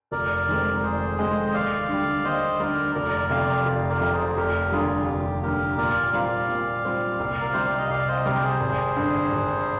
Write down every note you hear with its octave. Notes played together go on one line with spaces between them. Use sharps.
F1 A#4 D5
F2 D#3 G#3 C4
F1 G#4 C5
F2 D#3 G#3 C4 C5 D#5
D#2 D5 F5
D3 G3
D#2 C5 D#5
D3 G3 A#4 D5
F1 A#4 D5
F2 C3 D5 F5
F1
A#4 D5
F2 C3
G#4 C5
F1 G4 A#4
D#2 D3 G3 F4 G#4
F1 G4
D#2 D3 G3 G4 A#4
A#2 A#4 D5
G3 C4 F4 D5 F5
A#2
G3 C4 F4
C2
A#4
C3 G3 C5
D5
D#5
C2 D5 F5
C5 D#5
C3 G3 A#4 D5
G#4 C5
G#1
G2 D3
G#1